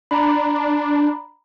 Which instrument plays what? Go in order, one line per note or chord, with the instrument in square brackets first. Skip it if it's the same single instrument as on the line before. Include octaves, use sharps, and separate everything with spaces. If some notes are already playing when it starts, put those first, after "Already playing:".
[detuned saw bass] D4 [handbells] A#5 B5